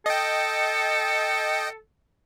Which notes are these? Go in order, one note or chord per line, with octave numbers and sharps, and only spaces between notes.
A4 D#5 G5